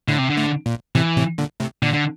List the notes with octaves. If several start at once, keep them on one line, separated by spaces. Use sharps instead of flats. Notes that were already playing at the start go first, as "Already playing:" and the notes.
A2 D3
C3
D3
A2
A#2
A2 C3 E3
A2 C3
A#2 D3
A2 C3
A#2 D3
D3